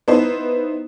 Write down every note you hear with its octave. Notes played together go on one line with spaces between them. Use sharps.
B3 D#4 E4 C5